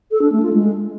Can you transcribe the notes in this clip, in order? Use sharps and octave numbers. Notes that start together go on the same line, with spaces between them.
A4
D4
A3
F4
G#3